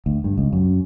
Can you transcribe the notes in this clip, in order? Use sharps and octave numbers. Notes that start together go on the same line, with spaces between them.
D2
G2
C#2
F#2